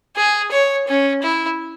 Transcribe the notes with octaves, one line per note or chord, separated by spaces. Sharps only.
G#4
C#5
C#4
E4